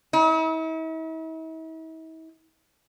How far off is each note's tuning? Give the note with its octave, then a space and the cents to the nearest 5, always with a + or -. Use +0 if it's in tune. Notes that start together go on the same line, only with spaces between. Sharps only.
E4 -45